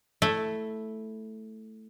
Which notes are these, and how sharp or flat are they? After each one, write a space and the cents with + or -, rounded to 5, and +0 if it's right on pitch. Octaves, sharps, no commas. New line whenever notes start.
A3 +0 E4 +0